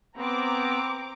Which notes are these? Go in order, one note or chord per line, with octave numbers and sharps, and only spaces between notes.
B3 C4 A#5 D6